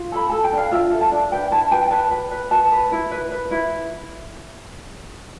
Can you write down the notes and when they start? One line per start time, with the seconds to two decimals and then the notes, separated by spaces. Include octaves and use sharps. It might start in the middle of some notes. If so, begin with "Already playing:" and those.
Already playing: F4
0.12 A4 B5
0.29 A4 A5
0.44 G5
0.52 D4
0.58 F5
0.71 F4 E5
0.92 A4
1.01 A5
1.11 D4
1.31 B4 G5
1.51 E4 A5
1.71 B4 G5
1.91 B4 A5
2.11 B4
2.31 B4
2.51 B4 A5
2.72 B4
2.92 E4
3.11 B4
3.32 B4
3.51 E4